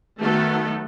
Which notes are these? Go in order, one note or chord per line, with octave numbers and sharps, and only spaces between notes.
D#3 F#3 A3 B3 A4